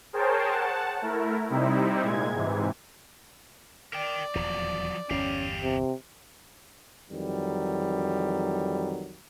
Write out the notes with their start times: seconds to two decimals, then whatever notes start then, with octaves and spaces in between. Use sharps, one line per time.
0.13 G#4 A#4 C5 C#5 G5 A5
0.49 F#5 A5
1.02 A3 E4 A#4
1.50 C3 G3 C4 D#4 E4
2.03 A#2 G#3 G#6
2.33 G#2 C3 E3
3.93 A#4 D5 G5
4.35 D#1 E2 F3 F#3
5.10 G1 E2 C#4 G4 F5
5.63 C3
7.09 F2 D#3 E3 F#3 G3